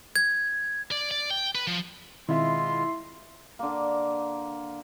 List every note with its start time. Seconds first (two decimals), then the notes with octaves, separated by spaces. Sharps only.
0.16 G#6
0.91 D5
1.11 D5
1.30 G5
1.55 B4
1.67 F3
2.29 B2 D#3 G#3 C4 E4 F4 E5 C6
3.59 D3 A#3